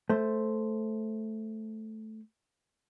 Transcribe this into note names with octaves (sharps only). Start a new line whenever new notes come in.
A3 C5